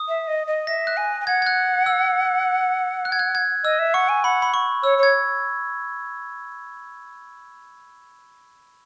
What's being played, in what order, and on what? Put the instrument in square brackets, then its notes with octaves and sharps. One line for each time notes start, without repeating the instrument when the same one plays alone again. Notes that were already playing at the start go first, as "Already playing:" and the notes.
Already playing: [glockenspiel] D#6
[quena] E5
D#5
D#5
[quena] E5 [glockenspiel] A#6
[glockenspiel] F#6
[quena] G#5
G#5
[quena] F#5 [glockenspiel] G#6
[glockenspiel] G#6
F#6
E6
F#6
G#6
F#6
G#6
[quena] D#5 [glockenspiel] E6
[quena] E5
[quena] F#5 [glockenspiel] C#6
[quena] G#5
[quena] F#5 [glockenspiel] B5
[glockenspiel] B5
C#6
[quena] C#5 [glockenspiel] E6
[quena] C#5 [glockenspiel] G#6